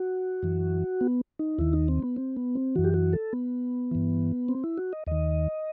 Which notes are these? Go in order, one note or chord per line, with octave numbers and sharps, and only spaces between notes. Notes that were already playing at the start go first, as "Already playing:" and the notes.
Already playing: F#4
F#2 E3
B3
D#4
D#2 D#3 E4
D#4
C4
B3
C4
B3
C4
F#2 E3 F#4
G4
F#4
A4
B3
G2 E3
C4
E4
F#4
D#5
D#2 D#3 D#5